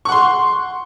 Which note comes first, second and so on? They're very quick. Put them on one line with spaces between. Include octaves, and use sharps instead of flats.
C#6 F#5 C6